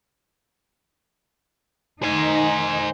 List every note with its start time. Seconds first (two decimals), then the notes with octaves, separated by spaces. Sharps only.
2.03 D#3 D#4 C5 G#5